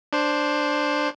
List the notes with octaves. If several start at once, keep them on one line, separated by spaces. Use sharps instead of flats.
D4 C5